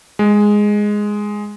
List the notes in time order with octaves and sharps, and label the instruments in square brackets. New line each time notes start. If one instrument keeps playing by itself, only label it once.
[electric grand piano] G#3